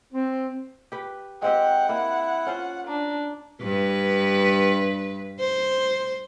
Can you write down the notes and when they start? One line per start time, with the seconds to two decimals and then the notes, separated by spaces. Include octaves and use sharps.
0.13 C4
0.92 G4 B4
1.42 G#3 C4 G4 F#5 G5
1.89 A#3 E4
2.47 C#4 F4 C5
2.87 D4 A#5
3.62 G2 B4
5.40 C5